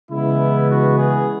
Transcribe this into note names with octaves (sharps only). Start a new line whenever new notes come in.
C#3 E3 G#3 B3 E4
F#4
G#4